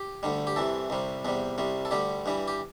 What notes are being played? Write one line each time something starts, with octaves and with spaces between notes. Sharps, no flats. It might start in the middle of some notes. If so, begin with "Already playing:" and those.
Already playing: G4
D2 D3 G3
G4
C2 C3 E3 A4
C2 C3 G3
E2 C3 G3
C2 C3 G3
A4
D2 D3 G3 G4
G2 E3 G3
G4